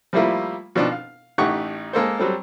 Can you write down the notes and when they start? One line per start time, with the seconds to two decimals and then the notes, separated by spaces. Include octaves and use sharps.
0.13 F3 G3 A3 A#3 E4 F4
0.75 B2 F3 C4 D4 D#4
0.92 F5
1.38 A1 A3 D#4 G4 F#5 C#6
1.93 G#3 A#3 A4 C5
2.18 F#3 G3 C4 A4